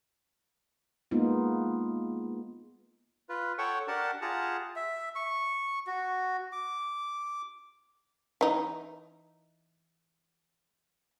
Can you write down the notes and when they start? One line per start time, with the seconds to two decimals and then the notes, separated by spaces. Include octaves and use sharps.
1.11 G#3 A#3 B3 D#4 F4
3.29 F4 B4
3.58 A4 C#5 F#5 G5 C#6
3.88 D4 G4 A#4 F#5 A5
4.22 F4 G4 G#4 F#5 A5 A#5
4.76 E5
5.15 C#6
5.87 F#4
6.52 D6
8.41 E3 D#4